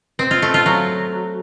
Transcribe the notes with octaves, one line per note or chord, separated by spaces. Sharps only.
C4
F4
A3
F4
F#3